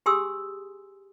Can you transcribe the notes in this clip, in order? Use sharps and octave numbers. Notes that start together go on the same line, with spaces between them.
G4 G#4 G#5 C6 D#6 E6